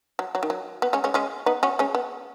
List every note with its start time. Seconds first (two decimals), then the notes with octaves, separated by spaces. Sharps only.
0.19 F#3
0.35 F#3
0.43 D#3
0.50 F#3
0.82 B3
0.93 G#3 C#4
1.04 G#3 C#4
1.14 G#3 C#4
1.46 B3 D#4
1.63 C#4 F#4
1.79 G#3 C#4
1.95 B3